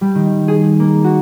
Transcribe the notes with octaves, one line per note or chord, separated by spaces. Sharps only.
G3
D#3
G#4
A#3
F#4